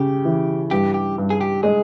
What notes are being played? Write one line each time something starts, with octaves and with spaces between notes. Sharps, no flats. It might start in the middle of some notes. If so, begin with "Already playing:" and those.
Already playing: C#3 G4
E3
G2 G4
G4
G2
G#4
G4
G#3 G#4